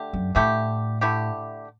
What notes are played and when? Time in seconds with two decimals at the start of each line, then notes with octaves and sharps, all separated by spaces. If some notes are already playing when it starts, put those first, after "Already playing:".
Already playing: D3 A3 G4
0.13 F#2
0.35 A2 D3 A3 E4 G4
1.01 D3 A3 E4 G4